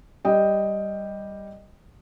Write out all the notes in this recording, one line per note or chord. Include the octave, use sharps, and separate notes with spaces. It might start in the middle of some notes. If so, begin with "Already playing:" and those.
G3 D#5 G5